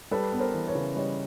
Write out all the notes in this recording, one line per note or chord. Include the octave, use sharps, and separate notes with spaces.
G3 A4 B4
B3
A#4 C5
E3
B4 C#5
C#3
G3 C#5 D#5